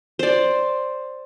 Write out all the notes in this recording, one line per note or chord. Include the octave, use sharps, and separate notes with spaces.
C5 D5